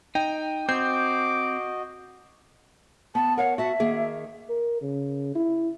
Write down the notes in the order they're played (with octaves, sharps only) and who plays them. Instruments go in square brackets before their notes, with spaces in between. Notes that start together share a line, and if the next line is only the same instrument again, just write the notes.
[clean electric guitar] D#4 [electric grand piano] G5
[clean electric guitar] C4 [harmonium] F#4 D#5 [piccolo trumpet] D6 [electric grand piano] G6
[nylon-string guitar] B3 [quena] A5
[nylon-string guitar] A#4 C#5 F5 [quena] F#5
[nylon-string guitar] F#4 A5 [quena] E5
[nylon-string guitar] D#3 A#3 G#4
[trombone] A#4
C#3
E4